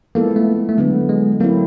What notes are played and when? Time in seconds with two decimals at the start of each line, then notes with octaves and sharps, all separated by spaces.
0.15 F3 G#3 A#3 B3 E4 A4
0.36 A3
0.69 A3
0.78 D3 F#3 G#3 B3
1.09 G#3
1.40 F#3 A3 A#3 C4 E4